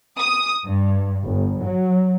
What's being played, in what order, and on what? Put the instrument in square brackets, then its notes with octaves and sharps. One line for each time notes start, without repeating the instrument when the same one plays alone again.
[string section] D#6
G2
G1
F#3